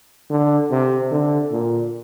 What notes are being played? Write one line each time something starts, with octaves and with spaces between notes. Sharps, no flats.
D3
C3
D3
A#2